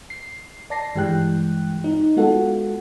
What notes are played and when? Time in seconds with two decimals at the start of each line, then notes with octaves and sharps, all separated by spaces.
0.10 C7
0.70 D5 A5 A#6 C7
0.95 G2 E3 G#3 G4 G5 F#6
1.84 D#4
2.16 G#3 B3 F4 F#4 A4 F#5